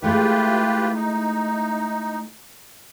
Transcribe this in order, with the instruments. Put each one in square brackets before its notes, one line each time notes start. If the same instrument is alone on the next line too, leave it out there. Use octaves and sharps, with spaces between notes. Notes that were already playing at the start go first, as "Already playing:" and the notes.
[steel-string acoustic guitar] G#3 A3 E4 [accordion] F4 G4 B4
[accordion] D#4